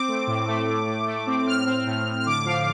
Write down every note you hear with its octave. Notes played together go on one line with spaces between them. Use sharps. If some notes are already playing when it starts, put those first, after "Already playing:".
Already playing: C4 D6
A3
A2
A3
A2
A2
A3
C4
A2 F6
C4
A2
A2
F6
D3 D6
F3 F5